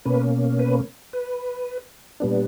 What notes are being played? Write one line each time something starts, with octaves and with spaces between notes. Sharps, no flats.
B2 A#3 C#4 B4
B4
B4
A#2 G3 B3 D4